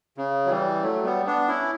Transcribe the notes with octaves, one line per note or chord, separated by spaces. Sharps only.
C#3
F#3
E3 G3
F#3 A3
G3 B3
B3 D4
C#4 E4